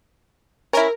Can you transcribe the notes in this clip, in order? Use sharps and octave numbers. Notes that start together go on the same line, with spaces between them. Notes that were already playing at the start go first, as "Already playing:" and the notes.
C#4 E4 A#4